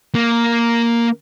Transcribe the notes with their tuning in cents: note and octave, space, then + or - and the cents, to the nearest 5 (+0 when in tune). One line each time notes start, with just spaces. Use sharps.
A#3 +0